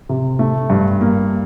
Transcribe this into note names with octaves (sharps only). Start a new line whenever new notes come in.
C3
A3
G2
A#3